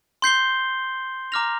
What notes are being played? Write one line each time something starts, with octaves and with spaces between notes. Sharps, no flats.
C6 G6 C7 G7
A#5 D6 F6 A#6 F7